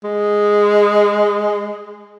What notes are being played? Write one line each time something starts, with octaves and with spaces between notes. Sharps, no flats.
G#3